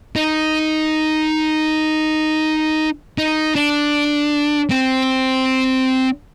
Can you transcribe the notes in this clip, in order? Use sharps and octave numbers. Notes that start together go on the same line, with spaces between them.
D#4
D#4
D4
C4